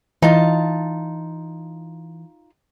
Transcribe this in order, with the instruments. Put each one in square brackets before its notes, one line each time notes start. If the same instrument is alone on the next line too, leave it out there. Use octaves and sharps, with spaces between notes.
[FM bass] E3 [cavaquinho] D#4 F4 A5